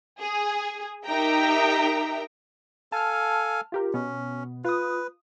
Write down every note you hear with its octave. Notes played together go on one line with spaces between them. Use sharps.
G#4
D#4 G4 A#4 E5 G5 A#5
A4 F5 G#5 A5 F6
F4 G4 A#4
B2 B3 C#4
F4 B4 D#6